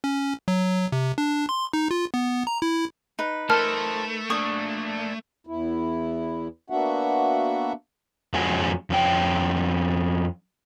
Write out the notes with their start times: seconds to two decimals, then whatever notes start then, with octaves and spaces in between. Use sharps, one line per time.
0.04 C#4
0.48 F#3
0.92 C3
1.18 D4
1.49 C6
1.73 D#4
1.91 F4
2.14 B3
2.47 A#5
2.62 E4
3.19 D#4 B4
3.50 A3 A4 A#4 C5 A5 F6
4.30 A#3 D4 C#6 D#6
5.47 E2 E4
6.70 A#3 B3 D4 F#4 E5 F#5
8.34 F2 G#3 C#4 F#4 G#5
8.90 F2 C#4 G5